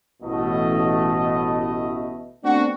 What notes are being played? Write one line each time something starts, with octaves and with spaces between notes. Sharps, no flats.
A1 B2 A3 D#5
A3 B3 C4 D4 F#4